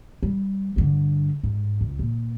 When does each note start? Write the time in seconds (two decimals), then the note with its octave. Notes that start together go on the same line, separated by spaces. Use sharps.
0.23 G3
0.76 G2 D3
1.43 G#2
1.81 C#2
1.99 A#2